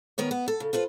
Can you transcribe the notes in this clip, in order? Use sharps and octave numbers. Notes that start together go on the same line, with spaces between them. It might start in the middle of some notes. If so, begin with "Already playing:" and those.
D#3 B3 A#4 C#5
B3
A4
C#3
F4 A4 B4 C5